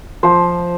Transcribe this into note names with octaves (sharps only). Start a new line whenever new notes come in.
F3 C5